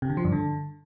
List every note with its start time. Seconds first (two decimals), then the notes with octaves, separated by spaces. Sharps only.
0.02 C3
0.10 D3
0.17 F3
0.25 G2
0.32 D3